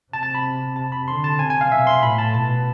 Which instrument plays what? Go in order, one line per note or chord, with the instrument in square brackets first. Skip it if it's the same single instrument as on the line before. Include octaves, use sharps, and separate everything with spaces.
[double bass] C3 [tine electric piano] A5
[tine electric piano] A5
B5
A5
B5
[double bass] D3 [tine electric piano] C6
[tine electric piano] A5
[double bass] C3 [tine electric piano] G#5
[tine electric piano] G#5
F5
[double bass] B2 [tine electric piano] E5
[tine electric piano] C6
[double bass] A2 [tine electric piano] B5
[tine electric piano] A5
[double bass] B2 [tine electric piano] A5